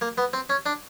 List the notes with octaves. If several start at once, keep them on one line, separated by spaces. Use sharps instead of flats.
A#3
B3
C4
C#4
D4